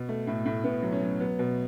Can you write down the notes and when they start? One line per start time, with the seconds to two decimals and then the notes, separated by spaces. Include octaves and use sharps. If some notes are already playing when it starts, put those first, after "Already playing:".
Already playing: B2
0.09 A3
0.27 A2
0.46 A2
0.64 A2 B3
0.83 F#3
0.92 C#4
1.02 F#3
1.20 F#3 B3
1.39 B2